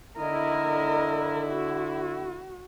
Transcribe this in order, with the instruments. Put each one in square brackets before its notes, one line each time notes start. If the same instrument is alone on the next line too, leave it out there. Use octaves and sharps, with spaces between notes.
[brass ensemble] D3 E4 [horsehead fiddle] A#4 D#5
[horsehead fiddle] F#4